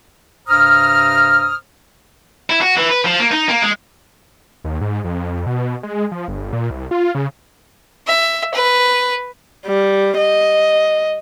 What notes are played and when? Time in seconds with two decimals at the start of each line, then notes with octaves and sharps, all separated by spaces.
0.48 G2 C3 C5 A#5 D#6 F6
2.50 E4
2.61 F#4
2.76 E3
2.90 B4
3.05 F3
3.20 A#3
3.31 D#4
3.48 A#3
3.62 G#3
4.64 D#2
4.81 G#2
5.04 F2
5.46 B2
5.83 G#3
6.12 F3
6.28 G1
6.53 A#2
6.70 C2
6.91 F4
7.15 C#3
8.07 E5
8.54 B4
9.67 G3
10.17 D#5